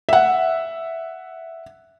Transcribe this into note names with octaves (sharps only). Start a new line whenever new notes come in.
E5 F#5